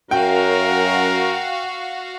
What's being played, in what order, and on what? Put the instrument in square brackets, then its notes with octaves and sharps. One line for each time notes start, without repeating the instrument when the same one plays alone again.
[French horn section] F#2 [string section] F#4 F5 [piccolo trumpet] A#4 [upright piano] G5